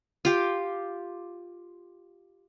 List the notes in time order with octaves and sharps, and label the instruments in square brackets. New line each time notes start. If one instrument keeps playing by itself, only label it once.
[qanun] F4 G4